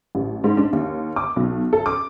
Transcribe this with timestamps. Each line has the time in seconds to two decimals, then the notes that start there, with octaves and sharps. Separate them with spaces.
0.15 A1
0.44 G#2
0.57 D4
0.73 D#2
1.16 D6
1.36 B1
1.73 A4
1.86 D6